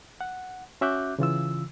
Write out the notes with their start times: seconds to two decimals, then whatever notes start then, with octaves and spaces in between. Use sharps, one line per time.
0.21 F#5
0.81 C#4 F#4 E5 D6 F#6 G6
1.19 C#3 E3 F4 E6